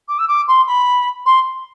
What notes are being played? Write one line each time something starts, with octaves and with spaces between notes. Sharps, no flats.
D6
E6
D6
C6
B5
C6